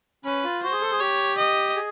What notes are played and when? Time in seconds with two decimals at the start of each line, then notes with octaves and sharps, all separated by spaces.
0.25 C#4 B4
0.44 F4
0.63 F#4 C5
0.72 G#4
0.81 A4
0.91 G#4
1.00 G4 C#5
1.38 D#5
1.76 G#4